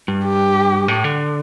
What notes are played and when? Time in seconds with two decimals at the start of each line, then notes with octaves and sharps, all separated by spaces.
0.08 G2
0.25 G4
0.88 A2
1.04 D3